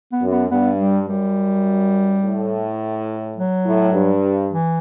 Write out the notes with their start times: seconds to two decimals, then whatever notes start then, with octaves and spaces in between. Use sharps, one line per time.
0.12 B3
0.22 F#2
0.32 B3
0.50 G2 B3
0.79 G3
1.08 F#2 G3
2.22 A2
3.36 F#3
3.66 A2
3.93 G2
4.52 E3